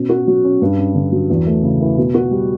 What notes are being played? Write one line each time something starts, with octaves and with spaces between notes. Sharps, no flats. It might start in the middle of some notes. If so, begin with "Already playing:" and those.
Already playing: B2 C#4
F#4
F#3
C#4
G2
C#4
D3
F#3
E2
A3
C#3
E3
B2
F#4
G3